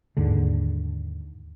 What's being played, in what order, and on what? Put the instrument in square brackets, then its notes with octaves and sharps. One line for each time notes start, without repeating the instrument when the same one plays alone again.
[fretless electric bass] D#2 G#2 D3